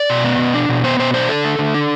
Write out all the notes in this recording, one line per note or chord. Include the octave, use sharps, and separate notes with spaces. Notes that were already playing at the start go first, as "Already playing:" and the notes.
Already playing: D5
B2
B3
B2
D4
B2
B3 C5
B2 C5
D4 C5
D3 A4
A3
D3
D4